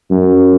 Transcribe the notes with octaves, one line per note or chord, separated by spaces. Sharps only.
F#2